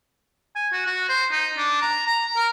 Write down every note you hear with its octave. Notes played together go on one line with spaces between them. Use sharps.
G#5
F#4
F#4
C5
D#4
D4
A#5
A#5
A#4